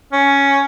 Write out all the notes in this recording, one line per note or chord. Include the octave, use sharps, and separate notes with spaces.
C#4